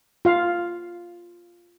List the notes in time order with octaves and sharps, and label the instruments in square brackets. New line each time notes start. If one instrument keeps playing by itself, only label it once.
[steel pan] F4 F5